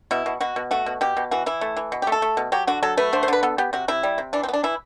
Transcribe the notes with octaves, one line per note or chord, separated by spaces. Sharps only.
B2 E4
B2
B2 F#4
B2
A3 F#4
B2
B2 G4
B2
E3 F#4
E3 E4
A3
E3
B2
G4
A3
A4
A3
B2
F#3 G4
D3 F#4
F#3 A4
A3 B4
D3 C5
C5
D3 B4
B3 A4
B3 G4
C3 F#4
C3 E4
G3
C3
E3 D4
C4
B3
D4
E3 E4